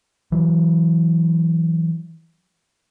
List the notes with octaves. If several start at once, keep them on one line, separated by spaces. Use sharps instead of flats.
E3 F#3